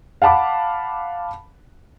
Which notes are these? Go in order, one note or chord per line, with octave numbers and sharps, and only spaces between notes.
F5 F#5 A5 B5 D6